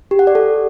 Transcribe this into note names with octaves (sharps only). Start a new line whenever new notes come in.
G4
F#5
D5
A4